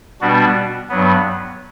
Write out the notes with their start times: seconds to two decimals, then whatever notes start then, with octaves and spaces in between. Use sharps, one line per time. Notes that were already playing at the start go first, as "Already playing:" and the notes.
0.21 B2 G3 B3 D4 F#4
0.89 G2 F#3 B3